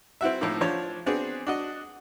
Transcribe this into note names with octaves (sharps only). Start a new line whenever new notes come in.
C4 E4 F#4 E5
A2 F3 A#3 D#4
F3 D4 C#5
B3 C4 D4 F#4 G#4
D4 F#4 D#5